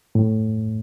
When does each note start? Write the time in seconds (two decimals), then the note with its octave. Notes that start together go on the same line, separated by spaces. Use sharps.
0.15 A2